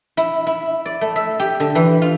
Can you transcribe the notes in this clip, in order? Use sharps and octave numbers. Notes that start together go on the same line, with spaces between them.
E4
E4
D5
A3
E5
G4
D3
E3
F4